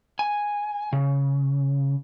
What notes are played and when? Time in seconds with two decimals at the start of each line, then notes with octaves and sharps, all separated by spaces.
0.19 G#5
0.93 C#3